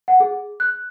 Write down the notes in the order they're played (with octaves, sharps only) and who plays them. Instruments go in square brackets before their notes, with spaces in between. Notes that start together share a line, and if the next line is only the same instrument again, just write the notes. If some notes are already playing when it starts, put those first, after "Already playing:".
[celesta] F#5
G#4
F#6